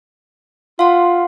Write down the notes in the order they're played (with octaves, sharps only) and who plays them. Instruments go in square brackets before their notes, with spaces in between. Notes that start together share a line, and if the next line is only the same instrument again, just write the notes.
[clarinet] F4 [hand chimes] F5 F#5 C6